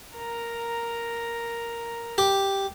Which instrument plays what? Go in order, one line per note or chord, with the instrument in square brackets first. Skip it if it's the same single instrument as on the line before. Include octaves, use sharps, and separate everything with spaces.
[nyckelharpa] A#4 A#5
[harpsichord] G4